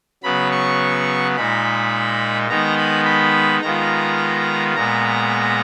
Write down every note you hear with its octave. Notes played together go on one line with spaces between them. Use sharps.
C#3 F#3 B3 B5
C#6
A#2 G#3 D#4 B5
D#3 G#3 B3 D#4 A#5
B5
B5
D#3 G#3 B3 F4 A#5
A#2 G#3 B3 A#5